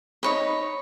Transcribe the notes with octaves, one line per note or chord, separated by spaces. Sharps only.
D#4 C#5 B5